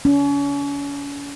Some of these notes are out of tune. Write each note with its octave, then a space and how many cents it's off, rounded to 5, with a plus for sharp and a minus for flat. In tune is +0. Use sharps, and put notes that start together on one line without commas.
C#4 +35